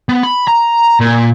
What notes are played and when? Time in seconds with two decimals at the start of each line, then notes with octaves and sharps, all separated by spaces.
0.09 B3
0.23 B5
0.48 A#5
1.01 A#2